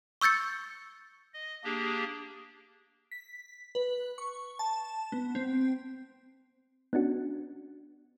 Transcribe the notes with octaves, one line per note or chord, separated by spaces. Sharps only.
C#6 E6 G6 A6 C#7
D#5
A#3 D4 G4 G#4
B6
B4
C#6
A5
B3
C4
B3 C#4 D4 F#4